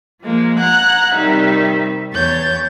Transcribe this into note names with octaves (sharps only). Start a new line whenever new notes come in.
F3 G#3 A#3
F#5 A#5 F#6 G#6
C3 D#3 G3 D#4 E5
E2 C#5 G6 A6